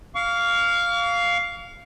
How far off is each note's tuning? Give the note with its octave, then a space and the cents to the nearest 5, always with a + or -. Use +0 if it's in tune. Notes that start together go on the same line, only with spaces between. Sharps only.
F5 +0 C#6 +45